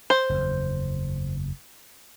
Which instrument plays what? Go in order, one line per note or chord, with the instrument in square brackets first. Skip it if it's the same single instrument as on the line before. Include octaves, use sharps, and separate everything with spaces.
[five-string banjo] C5
[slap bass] F#1 E2